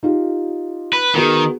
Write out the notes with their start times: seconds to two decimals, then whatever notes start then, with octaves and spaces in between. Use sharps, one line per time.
0.03 D#4 F4 G4
0.93 B4
1.15 D#3 B3 F#4 G#4